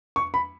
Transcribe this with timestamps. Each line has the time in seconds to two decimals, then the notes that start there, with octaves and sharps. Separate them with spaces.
0.16 C#6
0.34 B5